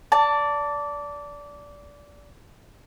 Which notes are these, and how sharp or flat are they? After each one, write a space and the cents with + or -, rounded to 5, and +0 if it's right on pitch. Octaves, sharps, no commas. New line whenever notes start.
D5 -20 A5 +15